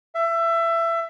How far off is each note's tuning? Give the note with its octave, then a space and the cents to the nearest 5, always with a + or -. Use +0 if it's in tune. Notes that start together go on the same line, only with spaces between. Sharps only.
E5 +20